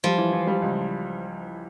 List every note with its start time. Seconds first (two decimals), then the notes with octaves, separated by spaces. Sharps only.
0.04 F3 G3
0.18 E3
0.33 E3
0.47 G3
0.62 C#2